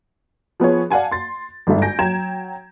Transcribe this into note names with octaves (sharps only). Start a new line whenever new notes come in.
F3 B3 G#4 C#5
D5 F5 F#5 G#5 A5
C6 A6
G1 G#2 D3 E5
G#5 G6 A#6 D7
F#3 G5 A#5 G#6 E7